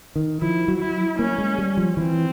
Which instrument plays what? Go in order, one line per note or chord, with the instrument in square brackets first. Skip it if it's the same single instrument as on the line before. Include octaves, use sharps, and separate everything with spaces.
[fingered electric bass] D#3
[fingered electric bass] F3 [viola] E4
[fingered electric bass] F#3
[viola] E4
[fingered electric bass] A#3 [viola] C#4
[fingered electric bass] G#3
G3
F3
[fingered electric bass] E3 [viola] C4